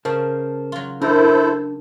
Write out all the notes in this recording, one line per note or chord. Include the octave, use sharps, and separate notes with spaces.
C#3 A#4 C5 A5
F#3 F4
D4 E4 A4 A#4 C5